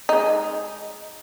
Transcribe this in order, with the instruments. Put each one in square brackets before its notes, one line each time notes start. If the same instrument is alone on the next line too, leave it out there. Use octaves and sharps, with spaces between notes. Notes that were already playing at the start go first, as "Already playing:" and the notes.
[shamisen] G#3 D#4